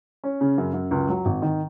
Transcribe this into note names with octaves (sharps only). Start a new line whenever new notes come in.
C#4
C#3
F#2
F#2
C#2
F#3
G#1
D#3